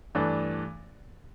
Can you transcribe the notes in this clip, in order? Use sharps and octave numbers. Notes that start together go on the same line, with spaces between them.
G2 E3 A3 D4